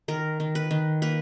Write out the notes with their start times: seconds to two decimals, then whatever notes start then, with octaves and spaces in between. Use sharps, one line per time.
0.08 D#3 A#4
0.40 D#3
0.55 B4
0.71 D#3
1.02 A#3 B4